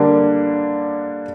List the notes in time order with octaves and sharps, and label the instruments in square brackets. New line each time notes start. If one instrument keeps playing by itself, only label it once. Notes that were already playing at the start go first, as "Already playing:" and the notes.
Already playing: [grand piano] D3 G3 A#3 D4